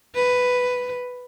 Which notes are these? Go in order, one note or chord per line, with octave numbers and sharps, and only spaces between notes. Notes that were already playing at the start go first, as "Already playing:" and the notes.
B4